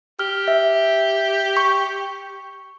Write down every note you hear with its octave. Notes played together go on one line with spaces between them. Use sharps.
G4 F6
E5
C#6